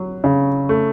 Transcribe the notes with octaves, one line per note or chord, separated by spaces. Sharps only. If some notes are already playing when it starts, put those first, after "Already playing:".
Already playing: F#3
C#3
A3